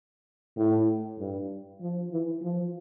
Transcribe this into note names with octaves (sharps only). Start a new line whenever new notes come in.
A2
G2
F3
E3
F3